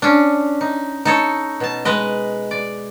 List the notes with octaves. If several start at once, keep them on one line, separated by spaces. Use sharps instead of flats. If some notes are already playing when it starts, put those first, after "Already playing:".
C#4 D4
D#4
D#4 A4 C#5
B2 A5
G#3 B4 D#5
D5